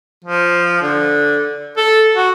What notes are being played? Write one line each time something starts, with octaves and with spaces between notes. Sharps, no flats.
F3
D3
A4
F#4